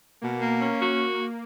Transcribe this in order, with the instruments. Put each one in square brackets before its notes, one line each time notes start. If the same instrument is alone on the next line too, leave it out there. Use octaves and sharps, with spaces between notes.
[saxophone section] B2 [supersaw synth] A#3
[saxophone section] A#3
C#4
F#4